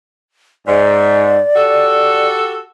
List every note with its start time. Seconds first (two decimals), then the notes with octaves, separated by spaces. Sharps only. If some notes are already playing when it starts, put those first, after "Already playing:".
0.67 G#2 D5
1.56 F#4 G4 A4